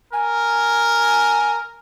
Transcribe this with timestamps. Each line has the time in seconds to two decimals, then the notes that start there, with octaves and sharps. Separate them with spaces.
0.13 A#4 G#5